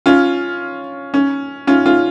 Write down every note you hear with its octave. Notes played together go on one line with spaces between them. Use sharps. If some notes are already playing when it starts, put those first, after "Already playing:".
C#4 F4
C#4
C#4 F4
C#4 F4